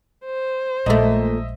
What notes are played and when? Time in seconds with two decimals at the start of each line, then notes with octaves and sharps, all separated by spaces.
0.24 C5
0.86 A#1 A#2 G#3 A3 D#5 E5